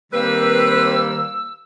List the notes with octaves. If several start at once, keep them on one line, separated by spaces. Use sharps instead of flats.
D#3 G3 A#3 C4 B4 C5 E6